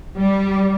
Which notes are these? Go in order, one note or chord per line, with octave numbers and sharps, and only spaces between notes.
G3